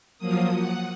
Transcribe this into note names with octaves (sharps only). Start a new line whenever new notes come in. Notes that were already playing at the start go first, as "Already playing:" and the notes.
F3 F#3 A#3 D#6
F#5